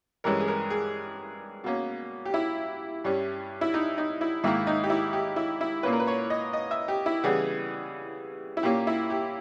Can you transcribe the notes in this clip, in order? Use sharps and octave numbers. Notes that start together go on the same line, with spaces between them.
G2 E3 G#3 C#4 A#4
G#4
A#4
G#4
B2 A#3 C#4
G4
E4
G2 G3 C#4
E4
D#4
D#4
E4
G#2 D#3 A#3 E4
D#4
G4
E4
G4
E4
E4
A#2 A#3 C#4 B4
A#4
B4
C#5
D#5
D#5
E5
G4
E4
C#3 E3 G3 B3 G#4
E4
A#2 A#3 C#4 G4
E4
G4